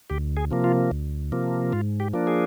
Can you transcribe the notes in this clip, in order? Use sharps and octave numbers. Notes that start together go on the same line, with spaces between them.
D2 G4
G#4
C3 F3 A#3
F4
D2
C3 F3 A#3
G#2 F4
G4
F3 A#3 D4
G#4